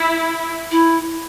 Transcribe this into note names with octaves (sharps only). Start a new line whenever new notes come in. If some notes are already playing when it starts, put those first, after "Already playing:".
Already playing: E4
E4